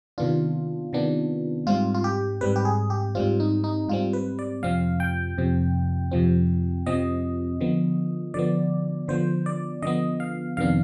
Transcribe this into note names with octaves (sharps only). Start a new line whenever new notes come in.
C3 D#3 B3 D4 F4
C3 D#3 B3 D4
G#2 G3 C4 F4
F4
G4
G#2 G3 C4 B4
G4
G#4
G4
G#2 G3 C4 F4
D#4
D#4
G#2 G3 C4 F4
B4
D5
F2 C3 F3 C4 F5
G5
F2 C3 F3 C4
F2 C3 F3 C4
F2 C3 F3 C4 D#5
D3 F3 B3
D3 F3 B3 D5
D3 F3 B3 C5
D5
D3 F3 B3 D#5
F5
F2 C3 D#3 B3 D4 F5